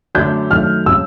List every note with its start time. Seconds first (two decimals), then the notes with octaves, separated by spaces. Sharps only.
0.15 F#2 D3 F#3 A3 D4 G6
0.50 F#2 D#3 F#3 A3 F6
0.86 C#3 F#3 E6